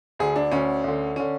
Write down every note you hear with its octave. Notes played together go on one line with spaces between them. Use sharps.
D2 D3 G#4
D4
D2 D3 C#4
D2 D3
D3 C#4